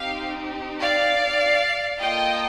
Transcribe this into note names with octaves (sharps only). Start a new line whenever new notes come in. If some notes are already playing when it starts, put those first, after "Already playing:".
Already playing: C4 D#4 G4 F5
D5 F5
A#3 F4 A4 D#5 G5